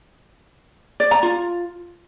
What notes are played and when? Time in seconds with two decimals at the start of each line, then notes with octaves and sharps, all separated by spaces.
1.00 D5
1.11 A#5
1.23 F4